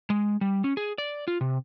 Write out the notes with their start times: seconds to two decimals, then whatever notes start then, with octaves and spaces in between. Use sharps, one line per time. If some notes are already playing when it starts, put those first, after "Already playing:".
0.10 G#3
0.41 G3
0.64 C#4
0.77 G#4
0.98 D5
1.28 F4
1.41 C3